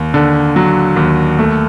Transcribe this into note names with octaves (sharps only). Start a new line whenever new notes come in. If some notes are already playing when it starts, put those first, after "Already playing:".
Already playing: D#2
D3
F#3
D#2
A3